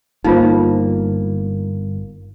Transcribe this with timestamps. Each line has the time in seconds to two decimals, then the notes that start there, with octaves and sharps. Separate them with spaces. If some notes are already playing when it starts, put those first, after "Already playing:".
0.24 G1 A#3 D#4 F4 C5